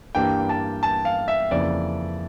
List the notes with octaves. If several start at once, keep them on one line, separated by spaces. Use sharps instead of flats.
G2 E3 G3 A#3 D4 G5
A5
A5
F5
E5
F2 C#3 E3 A#3 E4 D5